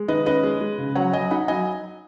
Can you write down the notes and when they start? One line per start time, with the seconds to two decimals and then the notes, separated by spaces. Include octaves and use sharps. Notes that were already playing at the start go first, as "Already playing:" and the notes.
Already playing: G#3
0.08 D#3 B4 D#5
0.26 C#4 B4 D#5
0.43 G#3
0.61 G#3
0.78 C#3
0.95 F#3 C#5 F#5
1.13 F#3 D#5 G#5
1.31 D#4 F#5 B5
1.48 F#3 D#5 G#5